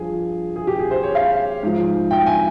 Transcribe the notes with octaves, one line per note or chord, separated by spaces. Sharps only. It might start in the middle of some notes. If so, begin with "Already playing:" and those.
Already playing: G2 F3 G#4
G#4
G4
G#4
C5
C#5
F5
G#2 F3
G5
G#5